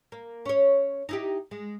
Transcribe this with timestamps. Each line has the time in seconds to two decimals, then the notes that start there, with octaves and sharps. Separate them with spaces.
0.12 A#3
0.46 C#4 C#5
1.09 D#4 E4 G4
1.51 G#3